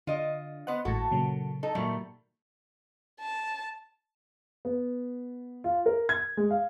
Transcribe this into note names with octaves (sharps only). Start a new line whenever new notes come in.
D3 F4 D#5
B3 C5 D#5 F#5
G#1 A2 F#4 A4
A#2 C#3 F#3
D#4 A4
A#2 D#3 F#3 G3 A3
A5
B3
F4
A#4
G#6
G#3
F5